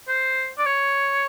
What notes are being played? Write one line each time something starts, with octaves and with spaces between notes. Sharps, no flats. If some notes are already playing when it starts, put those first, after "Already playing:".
C5
D5
C#5